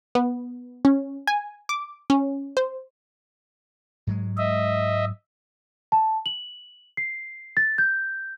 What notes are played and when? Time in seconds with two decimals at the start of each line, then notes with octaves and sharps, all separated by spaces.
0.15 B3
0.85 C#4
1.27 G#5
1.69 D6
2.10 C#4
2.57 C5
4.07 G#2 F#3 G#3
4.38 D#5 E5
5.92 A5
6.26 F#7
6.97 C7
7.57 A6
7.78 G6